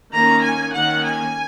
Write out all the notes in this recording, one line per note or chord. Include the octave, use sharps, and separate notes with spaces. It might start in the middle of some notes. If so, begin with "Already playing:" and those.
D#3 A#3 C#4 A#5
G#5
D#3 A#3 C#4 F#5
G#5